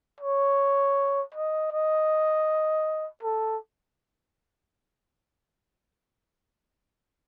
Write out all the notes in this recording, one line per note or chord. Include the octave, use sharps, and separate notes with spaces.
C#5
D#5
D#5
A4